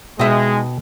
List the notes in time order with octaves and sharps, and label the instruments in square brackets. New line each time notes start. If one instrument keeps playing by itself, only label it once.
[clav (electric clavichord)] B2 G5 [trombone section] G#3 [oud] D#4 E5